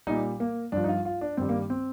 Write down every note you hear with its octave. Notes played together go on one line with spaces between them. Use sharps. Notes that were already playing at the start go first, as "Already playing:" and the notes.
A#2 G3 D#4
A#3
G2 F3 D4
D#4
F4
F4
D4
G2 D#3 G3 C4
A#3
C4